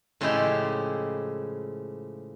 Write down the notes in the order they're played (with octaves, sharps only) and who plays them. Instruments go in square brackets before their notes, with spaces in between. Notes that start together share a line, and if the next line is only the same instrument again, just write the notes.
[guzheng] A2 C#3 F3 G#3 E4 G4